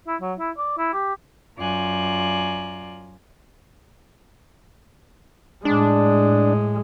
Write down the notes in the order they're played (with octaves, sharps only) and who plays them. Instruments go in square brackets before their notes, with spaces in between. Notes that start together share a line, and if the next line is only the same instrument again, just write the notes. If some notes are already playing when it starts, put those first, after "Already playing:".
[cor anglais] E4
F#3
E4
D5
E4
G4
[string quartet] F#2 F4 D5 G#5 A#5 F#6
[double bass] A2 G#3 [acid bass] D4